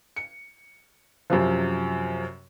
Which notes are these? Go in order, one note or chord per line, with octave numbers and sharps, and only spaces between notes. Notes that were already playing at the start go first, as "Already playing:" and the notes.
C#7
F#2 C3 F3